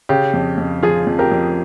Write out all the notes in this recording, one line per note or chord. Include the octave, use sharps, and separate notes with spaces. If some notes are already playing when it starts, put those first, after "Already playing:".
C#3 G4
F2
F2
F3 F4 G#4
F2
G4 A#4
F2